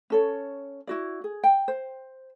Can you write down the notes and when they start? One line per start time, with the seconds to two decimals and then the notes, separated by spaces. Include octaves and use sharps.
0.10 C#4 A4 C#5
0.87 E4 F#4 D5
1.24 G#4
1.43 G5
1.68 C5